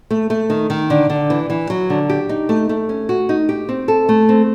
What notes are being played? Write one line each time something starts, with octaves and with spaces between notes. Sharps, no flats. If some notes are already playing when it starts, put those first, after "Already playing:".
A3
A3
D#3
D#3
D3
D3
E3
E3
F#3
D3
G4
D#4
A3
A3
C#4
F#4
D#4
G4
C4
A4
A3
C4